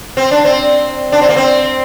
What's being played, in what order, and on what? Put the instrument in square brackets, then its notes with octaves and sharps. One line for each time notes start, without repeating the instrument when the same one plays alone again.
[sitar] C4
D4
C4
D4
C4
A#3
C4